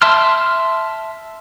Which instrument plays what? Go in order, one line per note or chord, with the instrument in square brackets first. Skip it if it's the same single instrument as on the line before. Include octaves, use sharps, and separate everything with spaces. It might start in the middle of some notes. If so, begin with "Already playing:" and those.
[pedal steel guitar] E5 A5 C6 F6